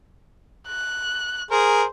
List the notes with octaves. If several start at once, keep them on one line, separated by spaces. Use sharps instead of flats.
F#6
G#4 A#4 C5